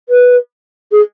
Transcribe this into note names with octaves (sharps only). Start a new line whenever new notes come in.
B4
G#4